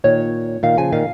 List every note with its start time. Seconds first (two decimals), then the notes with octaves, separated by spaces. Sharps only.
0.04 A#2 D#3 C#5
0.63 A#2 D#3 F5
0.77 C#3 F3 G#5
0.92 A#2 D#3 F5